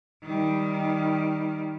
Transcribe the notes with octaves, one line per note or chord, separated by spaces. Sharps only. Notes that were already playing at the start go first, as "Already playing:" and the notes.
D#3 G3